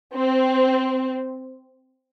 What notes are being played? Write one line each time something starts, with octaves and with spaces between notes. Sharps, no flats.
C4